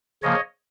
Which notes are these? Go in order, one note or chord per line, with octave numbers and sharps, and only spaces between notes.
C#3 F3 A#3 C#5 D#5